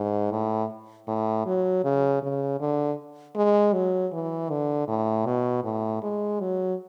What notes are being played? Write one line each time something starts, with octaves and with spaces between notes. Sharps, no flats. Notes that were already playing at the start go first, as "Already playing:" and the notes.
Already playing: G#2
A2
A2
F#3
C#3
C#3
D3
G#3
F#3
E3
D3
A2
B2
A2
G#3
F#3